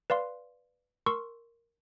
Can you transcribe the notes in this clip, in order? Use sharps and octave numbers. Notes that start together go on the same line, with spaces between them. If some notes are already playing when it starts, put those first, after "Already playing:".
B4 D5 F5 C6
A#4 C6 C#6 E6